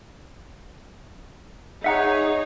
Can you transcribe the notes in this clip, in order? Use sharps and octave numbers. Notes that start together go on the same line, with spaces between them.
D#4 G#4 C#5 E5 F#5 A#5